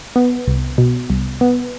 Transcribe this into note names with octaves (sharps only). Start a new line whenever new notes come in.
B3
C2
B2
C2
B3